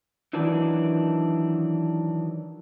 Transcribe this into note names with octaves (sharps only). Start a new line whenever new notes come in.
D#3 E3 F#3 D4